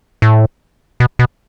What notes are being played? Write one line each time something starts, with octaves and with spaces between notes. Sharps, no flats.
A2
B2
B2